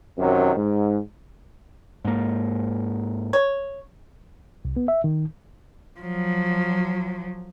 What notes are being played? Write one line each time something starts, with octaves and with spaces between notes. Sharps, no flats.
F#2 C3 D#3 F#3
G#2
G#2 A#3
C#5
C2
B3
E5
D#3
F3 F#3